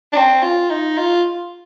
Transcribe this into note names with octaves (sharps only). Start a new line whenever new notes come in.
D4
C4
F4
D#4
F4